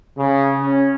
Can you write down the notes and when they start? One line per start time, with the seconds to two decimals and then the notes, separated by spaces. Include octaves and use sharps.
0.17 C#3
0.62 C#4